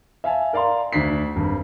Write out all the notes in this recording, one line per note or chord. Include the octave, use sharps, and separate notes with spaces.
E5 F5 G#5 A5
A#4 D5 F5 A#5 C6
D2 D4 B6 C7
G#1 G2